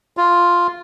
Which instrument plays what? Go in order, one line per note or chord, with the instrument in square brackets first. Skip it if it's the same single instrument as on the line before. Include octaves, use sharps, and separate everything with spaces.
[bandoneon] F4